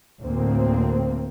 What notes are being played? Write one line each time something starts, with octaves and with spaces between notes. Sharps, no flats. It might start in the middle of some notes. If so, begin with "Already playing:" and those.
D2 A2 A#3 C4